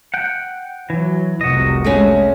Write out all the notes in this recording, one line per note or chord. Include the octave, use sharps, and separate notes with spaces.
F#5 G5
E3 F#3
F1 C2 C3 F#4 D#5
G#3 A3 C#4